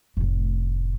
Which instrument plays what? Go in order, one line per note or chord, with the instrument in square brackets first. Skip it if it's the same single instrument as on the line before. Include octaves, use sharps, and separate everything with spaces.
[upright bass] F1 A2